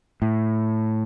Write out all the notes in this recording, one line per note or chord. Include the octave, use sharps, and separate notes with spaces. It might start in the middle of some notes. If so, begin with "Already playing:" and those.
A2